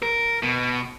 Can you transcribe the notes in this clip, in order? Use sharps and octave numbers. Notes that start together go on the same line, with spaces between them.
A#4
B2